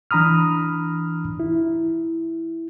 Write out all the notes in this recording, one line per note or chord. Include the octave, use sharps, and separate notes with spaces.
E3 D4 A#5 B5 D#6 F6
E4